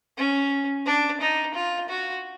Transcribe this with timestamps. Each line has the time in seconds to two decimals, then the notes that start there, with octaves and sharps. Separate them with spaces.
0.18 C#4
0.86 D4
1.21 D#4
1.54 F4
1.89 F#4